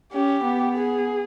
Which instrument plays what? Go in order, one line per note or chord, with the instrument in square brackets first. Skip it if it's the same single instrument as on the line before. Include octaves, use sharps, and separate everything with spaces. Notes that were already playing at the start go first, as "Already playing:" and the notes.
[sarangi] C#4 [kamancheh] G4
[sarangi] B3
[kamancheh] G#4